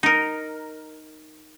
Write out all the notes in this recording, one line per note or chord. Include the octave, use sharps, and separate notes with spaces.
D#4 A#4